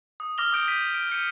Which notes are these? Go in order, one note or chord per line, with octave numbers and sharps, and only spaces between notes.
D#6
D6 F6 A#6 F7 G7
D6 D#6 G6 D7
G6 B6 D#7
D7
G6 C#7 D#7